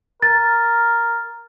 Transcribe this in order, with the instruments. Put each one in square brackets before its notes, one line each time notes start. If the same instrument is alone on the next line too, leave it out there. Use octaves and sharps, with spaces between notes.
[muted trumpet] A#4 [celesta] A6